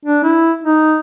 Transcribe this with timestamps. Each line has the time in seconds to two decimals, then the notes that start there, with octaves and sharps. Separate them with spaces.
0.05 D4
0.24 E4
0.63 D#4